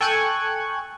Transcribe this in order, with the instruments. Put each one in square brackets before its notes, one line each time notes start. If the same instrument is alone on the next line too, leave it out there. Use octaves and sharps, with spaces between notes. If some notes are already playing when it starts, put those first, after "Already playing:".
[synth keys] A4 G5 G#5 C#6 F#6 G#6